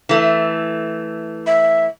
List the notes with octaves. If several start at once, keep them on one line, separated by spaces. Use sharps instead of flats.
E3 A3
E5